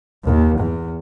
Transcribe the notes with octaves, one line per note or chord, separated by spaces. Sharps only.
D#2
E2